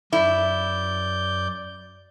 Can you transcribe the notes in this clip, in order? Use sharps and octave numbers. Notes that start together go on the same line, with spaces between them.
F#2 E4 D5 G6